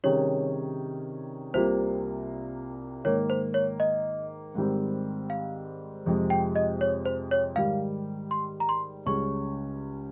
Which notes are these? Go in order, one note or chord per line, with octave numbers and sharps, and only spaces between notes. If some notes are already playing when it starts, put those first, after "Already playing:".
C3 D#3 G3 C#4 G#4 C#5
C2 C3 G3 A#3 F4 C5
G#2 D#3 A#3 C#5
C5
C#5
D#5
G#2 D#3 G3 C4
F5
F2 C3 F3 G#3
G5
D#5
C#5
C5
C#5
G#2 D#3 G3 F5
C6
A#5
C6
C#2 C#3 G3 C#4 C#6